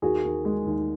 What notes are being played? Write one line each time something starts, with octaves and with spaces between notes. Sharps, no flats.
D#2 F#4 G#4
D#2
G#3
D#2